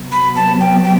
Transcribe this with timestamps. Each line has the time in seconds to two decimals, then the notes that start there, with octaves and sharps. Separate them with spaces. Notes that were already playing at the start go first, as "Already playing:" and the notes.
Already playing: C3 F#3 B3
0.12 B5
0.36 A5
0.60 G5
0.83 G5